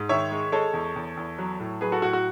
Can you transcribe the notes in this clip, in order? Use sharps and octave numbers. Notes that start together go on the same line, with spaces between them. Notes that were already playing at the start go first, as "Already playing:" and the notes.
Already playing: G#2
D#3 C#5 E5
G#3
G#3 A4 C#5
E2
E2
E2
F#3
A2
F#3 G#4 B4
F#4 A4
A2 F#4
F#4